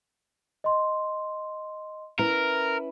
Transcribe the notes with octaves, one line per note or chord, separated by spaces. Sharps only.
D#5 C6
C#4 E4 A#4 B4